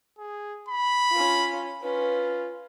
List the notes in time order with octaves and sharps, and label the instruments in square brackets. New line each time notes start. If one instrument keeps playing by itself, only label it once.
[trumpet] G#4
B5
[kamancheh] C#4 F4
[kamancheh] C#4 B4 [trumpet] F4